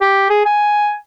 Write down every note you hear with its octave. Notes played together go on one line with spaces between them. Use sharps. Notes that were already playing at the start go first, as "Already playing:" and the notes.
G4
G#4
G#5